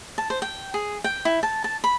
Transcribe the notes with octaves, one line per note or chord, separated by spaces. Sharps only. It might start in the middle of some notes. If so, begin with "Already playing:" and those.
A5
C5
G5
G#4
G5
E4
A5
A5
B5